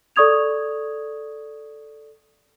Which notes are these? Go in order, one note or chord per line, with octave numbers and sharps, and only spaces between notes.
A4 D5 C#6 D#6 G#6 F7